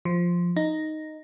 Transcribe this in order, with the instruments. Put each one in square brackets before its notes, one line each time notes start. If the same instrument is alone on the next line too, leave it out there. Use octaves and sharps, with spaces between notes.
[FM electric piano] F3
D#4